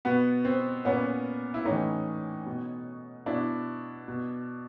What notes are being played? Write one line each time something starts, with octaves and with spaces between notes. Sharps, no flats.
B2 B3
C4
A#2 B3 C#4
E4
A2 E3 C#4 D#4
B2
B2 D4 E4
B2